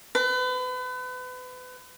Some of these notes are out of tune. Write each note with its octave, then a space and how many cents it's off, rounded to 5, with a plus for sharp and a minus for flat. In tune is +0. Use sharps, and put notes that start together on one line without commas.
B4 +35